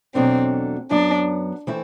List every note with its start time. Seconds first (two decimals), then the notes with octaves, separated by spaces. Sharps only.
0.15 E2 B2 F#3 A3 C4 D4
0.91 F#2 F#3 B3 D4
1.67 E3 A3 C4 E4